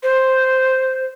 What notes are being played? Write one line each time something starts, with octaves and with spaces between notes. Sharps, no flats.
C5